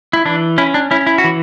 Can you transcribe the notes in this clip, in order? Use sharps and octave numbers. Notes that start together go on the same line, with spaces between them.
E4
E3 D4
C#4 E4
D4
C#4 E4
E4
F#4
E3